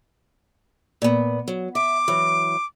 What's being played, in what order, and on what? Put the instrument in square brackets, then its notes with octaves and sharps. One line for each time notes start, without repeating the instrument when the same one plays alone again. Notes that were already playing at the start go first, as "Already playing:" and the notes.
[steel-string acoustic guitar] A#2 B3
F#3
[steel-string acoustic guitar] E5 [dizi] D6
[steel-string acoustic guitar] E3 F#3